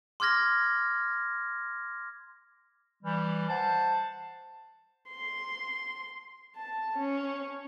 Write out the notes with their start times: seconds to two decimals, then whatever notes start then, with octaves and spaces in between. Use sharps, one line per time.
0.20 C6 D6 F6 G#6 A#6
3.04 E3 G3
3.49 C5 F#5 A5
5.09 C6
6.56 A5
6.98 C#4